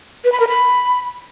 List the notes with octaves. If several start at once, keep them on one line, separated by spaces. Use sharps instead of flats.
B4
B5
A#4
B5